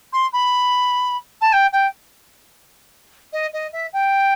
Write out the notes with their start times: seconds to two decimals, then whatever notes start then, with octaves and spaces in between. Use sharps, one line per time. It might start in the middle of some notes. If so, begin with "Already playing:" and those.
0.13 C6
0.33 B5
1.41 A5
1.53 G5
1.72 G5
3.33 D#5
3.53 D#5
3.73 E5
3.93 G5